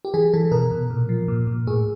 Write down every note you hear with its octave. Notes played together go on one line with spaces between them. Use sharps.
G4
E3 G#4
E3 A4
B2 A#4
B2
A#2
F3
A#2
A#2
A2 G#4